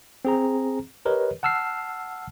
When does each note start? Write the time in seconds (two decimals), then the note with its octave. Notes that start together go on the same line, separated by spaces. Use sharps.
0.25 C4 G#4 A#5
1.05 G4 A#4 B4 C#5 D#5
1.43 F#5 A5 E6 F6 C7